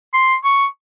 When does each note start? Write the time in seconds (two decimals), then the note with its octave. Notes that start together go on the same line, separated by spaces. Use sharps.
0.14 C6
0.44 C#6